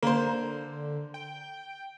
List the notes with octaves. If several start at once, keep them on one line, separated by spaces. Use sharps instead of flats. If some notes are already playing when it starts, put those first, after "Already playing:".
D3 A#3 C5
G5